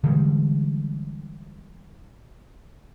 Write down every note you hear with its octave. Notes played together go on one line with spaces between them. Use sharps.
D3 E3 G3 G#3